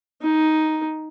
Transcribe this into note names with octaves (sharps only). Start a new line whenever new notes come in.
D#4